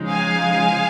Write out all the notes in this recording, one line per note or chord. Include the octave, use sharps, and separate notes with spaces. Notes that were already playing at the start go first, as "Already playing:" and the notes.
Already playing: C#3 F3 G#3 D#4
F5 G#5